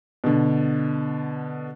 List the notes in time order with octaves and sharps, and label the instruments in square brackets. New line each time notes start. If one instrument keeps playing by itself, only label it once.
[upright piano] B2 D3